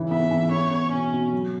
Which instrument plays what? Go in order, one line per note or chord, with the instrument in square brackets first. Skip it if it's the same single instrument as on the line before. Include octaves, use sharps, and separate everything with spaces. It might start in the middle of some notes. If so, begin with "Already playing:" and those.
Already playing: [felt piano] C#3 E3
[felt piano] B3 [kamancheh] E5
[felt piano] E3
[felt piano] B3 [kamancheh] C#5
[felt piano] B3
[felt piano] B2 [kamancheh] C#4
[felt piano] B2
F#3